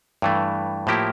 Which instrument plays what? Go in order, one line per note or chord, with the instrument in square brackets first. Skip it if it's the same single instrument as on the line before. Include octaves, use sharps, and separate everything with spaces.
[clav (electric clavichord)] G2 E3 A3
A2 F3 A#3 E4 G4